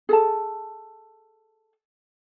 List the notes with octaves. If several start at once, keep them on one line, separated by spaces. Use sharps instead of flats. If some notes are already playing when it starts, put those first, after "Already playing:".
G#4 A4 A5